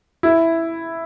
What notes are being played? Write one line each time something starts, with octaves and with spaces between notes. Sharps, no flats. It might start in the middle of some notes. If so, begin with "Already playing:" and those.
E4